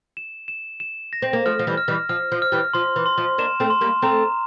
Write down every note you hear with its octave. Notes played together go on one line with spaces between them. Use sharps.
E7
E7
E7
A#6
C4
A#3
F3 A3 F6
F3
E3 G3
F6
E3 G3
F3 F6
F3
F6
E3 G3
F3 C6
E3
C6
F3
A#3 D4 E7
A3 C4
C6
G3 A#3
A3 C4 A#5